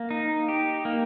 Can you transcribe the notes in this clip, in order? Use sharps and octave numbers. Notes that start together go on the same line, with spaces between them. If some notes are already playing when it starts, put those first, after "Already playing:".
Already playing: A#3
D#4
G4
A#3